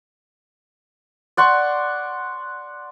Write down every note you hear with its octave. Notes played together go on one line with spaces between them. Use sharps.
D5 F#5 C6 C#6